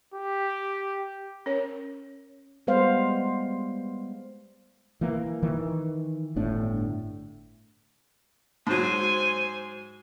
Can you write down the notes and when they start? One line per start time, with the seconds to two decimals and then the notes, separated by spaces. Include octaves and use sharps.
0.14 G4
1.46 C#4 A#4 C#5
2.67 G3 G#3 B3 B4 C5 F5
5.01 E3 A#3
5.43 D#3 E3
6.36 G1 A2 D4
8.67 G#2 F#3 C5 G#5